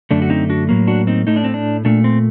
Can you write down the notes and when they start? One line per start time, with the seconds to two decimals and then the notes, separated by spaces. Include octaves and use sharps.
0.11 F#2 D3 A3 D4
0.22 F#4
0.30 C4 D#4
0.50 D4 F#4
0.69 A2 F#3 A#3
0.87 D4 F#4
1.07 C4 D#4
1.27 A2 A3 D#4
1.36 D4
1.44 C4
1.54 D4
1.85 A#2 A3 D4
2.04 C4